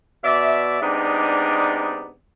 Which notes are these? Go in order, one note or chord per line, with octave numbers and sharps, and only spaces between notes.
B2 D5 E5
C3 G#3 B3 D4 D#4 D5